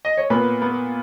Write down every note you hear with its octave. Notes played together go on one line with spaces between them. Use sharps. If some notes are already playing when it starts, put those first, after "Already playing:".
D#5
C#5
A#2 B3 B4
B3